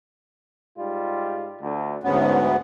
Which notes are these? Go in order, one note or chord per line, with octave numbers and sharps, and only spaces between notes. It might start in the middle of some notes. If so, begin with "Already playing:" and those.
G#2 G3 F4
D2
D2 G#2 F#3 B3 C#4